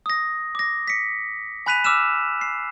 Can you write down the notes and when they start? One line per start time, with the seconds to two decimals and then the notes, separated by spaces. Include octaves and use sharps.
0.06 D#6 A#6
0.55 D6 A#6
0.88 B6 C#7
1.66 G#5 B5 F#6 B6 D#7 F7
1.84 D6 E6 F6 E7
2.41 C7